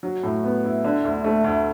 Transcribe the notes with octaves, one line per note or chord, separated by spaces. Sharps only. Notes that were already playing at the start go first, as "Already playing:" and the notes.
F#3
A2
B3
E4
D3
D2
A3
D2